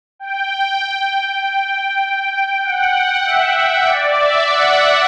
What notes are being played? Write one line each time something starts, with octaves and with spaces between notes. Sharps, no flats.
G5
F#5
E5
D5
E5
F#5